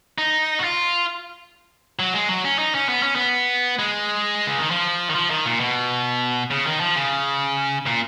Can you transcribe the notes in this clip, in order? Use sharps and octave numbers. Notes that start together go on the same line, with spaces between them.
D#4
F#4
F4
F#3
G#3
F#3
C#4
D#4
C#4
B3
C#4
B3
G#3
C#3
D#3
F3
D#3
F3
D#3
A#2
B2
C#3
D#3
F3
C#3
A#2